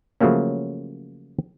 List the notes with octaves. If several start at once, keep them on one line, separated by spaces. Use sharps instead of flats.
C#3 F3 F#3 A3 A#3 C#4